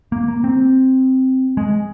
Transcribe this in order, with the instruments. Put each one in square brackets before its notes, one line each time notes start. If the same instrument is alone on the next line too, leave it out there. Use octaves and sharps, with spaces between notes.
[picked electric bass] A#3
A#3
C4
G#3